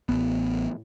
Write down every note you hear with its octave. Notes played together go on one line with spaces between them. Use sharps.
A1 B3